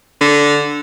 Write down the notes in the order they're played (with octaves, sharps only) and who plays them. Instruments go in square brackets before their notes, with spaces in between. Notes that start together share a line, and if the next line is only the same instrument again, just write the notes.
[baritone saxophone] D3